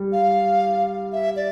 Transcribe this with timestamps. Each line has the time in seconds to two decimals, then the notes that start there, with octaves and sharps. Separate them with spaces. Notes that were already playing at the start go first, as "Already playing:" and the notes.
Already playing: G3
0.12 F5
1.13 E5
1.36 D5